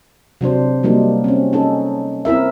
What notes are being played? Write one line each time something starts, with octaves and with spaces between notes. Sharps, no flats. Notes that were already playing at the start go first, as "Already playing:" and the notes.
C3 F#3 D4 C5
F#3 G3 A#3 D4 D#4
C4 C#4
C#4 D#4 A4
C4 E4 A#4 E5